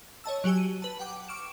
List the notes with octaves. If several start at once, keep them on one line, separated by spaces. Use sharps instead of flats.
C#5 D#5 A5 E6
F#3 F#4 G4 G#5 E6
D#7
B4 A5
F#5 G5 D6
C#6 D6 F6 D7 E7